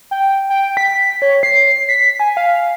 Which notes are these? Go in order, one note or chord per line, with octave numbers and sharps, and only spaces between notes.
G5
G5
B6
C#5
C7
B6
G#5
F5